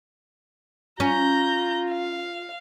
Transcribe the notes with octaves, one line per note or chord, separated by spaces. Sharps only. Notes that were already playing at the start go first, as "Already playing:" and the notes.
C#4 F4 A#5 G6
F5